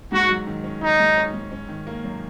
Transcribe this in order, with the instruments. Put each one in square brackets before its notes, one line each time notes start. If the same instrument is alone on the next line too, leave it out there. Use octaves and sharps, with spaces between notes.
[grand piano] G#2 [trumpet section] F#4
[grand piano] F#3
D#3
C#4
[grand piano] C#4 [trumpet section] D#4
[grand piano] G#2
C#4
G#2
C#4
D#3
A#3
F#2